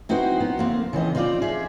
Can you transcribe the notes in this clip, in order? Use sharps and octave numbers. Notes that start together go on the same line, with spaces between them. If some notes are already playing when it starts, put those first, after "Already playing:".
C4 D#4 E4 F#4 B4 C5
B3
D2 A#3 C4
C#3 E3 C4 D#5
C4 D#4 F4 C5 D5
G#4 E5